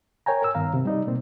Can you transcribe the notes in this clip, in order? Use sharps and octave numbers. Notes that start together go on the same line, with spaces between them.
A#4 C#5 G5 G#5 A#5
A#4 E6
G2 D#3 B3 F5 A#5
C3 C4
G3 D#4 D5
B2 A#3 C4